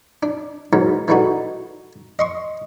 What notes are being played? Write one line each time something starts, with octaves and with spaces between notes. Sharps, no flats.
D4
E2 G#2 D#3 F#3
E3 G3 A3 D#4 F#4
D#5 C6 C#6